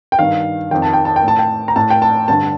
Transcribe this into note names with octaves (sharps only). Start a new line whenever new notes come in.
G5
G2 D#3 F5
F2 D#3 G5
A5
G5
A5
G5
A2 A5
G5
A#5
A2 A5
G5
A5
G2 D3 A5